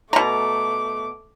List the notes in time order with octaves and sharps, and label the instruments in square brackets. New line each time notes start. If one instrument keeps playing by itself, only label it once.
[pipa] B2 A#5 [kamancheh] A3 D6